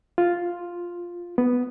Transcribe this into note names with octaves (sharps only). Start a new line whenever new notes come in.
F4
B3